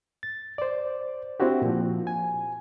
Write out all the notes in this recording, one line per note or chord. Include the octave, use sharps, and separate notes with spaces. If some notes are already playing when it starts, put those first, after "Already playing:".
A6
C5 D5
C4 D4 E4 F#4 G4
A#2 F3
G#5